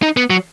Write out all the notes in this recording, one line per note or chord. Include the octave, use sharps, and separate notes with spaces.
D#4
B3
F#3